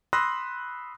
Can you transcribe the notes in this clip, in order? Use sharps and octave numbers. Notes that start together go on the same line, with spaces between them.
B5 C6 D#6 E6 F#6 A#6